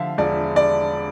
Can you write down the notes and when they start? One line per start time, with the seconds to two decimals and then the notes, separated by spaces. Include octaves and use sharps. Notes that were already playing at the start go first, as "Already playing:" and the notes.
Already playing: D3 F3 E5 F5
0.18 E1 D5
0.56 D5